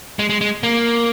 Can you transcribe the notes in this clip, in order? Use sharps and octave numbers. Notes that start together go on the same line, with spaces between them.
G#3
G#3
G#3
A#3